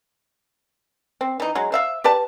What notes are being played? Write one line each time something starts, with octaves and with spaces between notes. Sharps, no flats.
C4
E3 D#4
F#3 G#3
C5 E5 F5
G4 B4 D5 A5